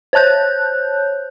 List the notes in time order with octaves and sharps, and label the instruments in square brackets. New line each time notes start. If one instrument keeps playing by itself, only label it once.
[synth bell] C5 C#5 A5 F#6 G6